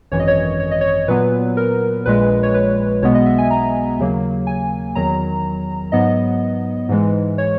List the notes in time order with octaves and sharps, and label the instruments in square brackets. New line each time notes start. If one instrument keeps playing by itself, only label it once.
[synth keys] G#1 F#2 E3 C#5
D#5
C#5
C#5
D#5
C#5
A#2 F#3 B3 B4
A#4
A#1 A#2 G#3 B4
C#5
B4
B1 B2 G#3 B3 C#5
D#5
E5
G#5
A#5
D#2 C#3 F#3 A#3
G#5
E2 D#3 F#3 A#5
G#2 F#3 B3 D#5
G#2 E3 G#3
C#5